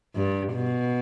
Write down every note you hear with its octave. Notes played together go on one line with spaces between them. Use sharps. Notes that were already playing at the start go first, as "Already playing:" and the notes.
G2
B2